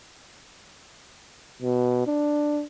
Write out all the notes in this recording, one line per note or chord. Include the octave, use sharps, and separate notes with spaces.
B2
D4